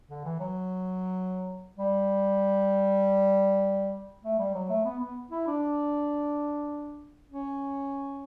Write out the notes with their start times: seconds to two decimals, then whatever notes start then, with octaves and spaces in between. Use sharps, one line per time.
0.09 D3
0.24 E3
0.40 F#3
1.77 G3
4.24 A3
4.39 G3
4.54 F#3
4.70 A3
4.85 B3
5.00 B3
5.31 E4
5.47 D4
7.31 C#4